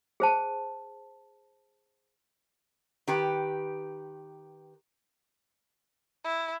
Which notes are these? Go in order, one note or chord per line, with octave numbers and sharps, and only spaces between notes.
G#4 C5 A5
D#3 G4 B4
E4